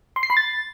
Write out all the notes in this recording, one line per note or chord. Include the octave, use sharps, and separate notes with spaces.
C6
C7
B5
A6